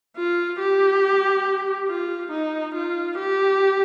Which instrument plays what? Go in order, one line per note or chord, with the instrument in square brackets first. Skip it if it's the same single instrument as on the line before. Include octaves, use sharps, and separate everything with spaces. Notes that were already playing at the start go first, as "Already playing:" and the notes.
[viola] F4
G4
F4
D#4
F4
G4